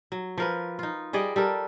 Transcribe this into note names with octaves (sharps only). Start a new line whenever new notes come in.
F#3
F3 A#4 B4
D#4 F4
G3 G#4 D5 D#5
G3 A4 A#4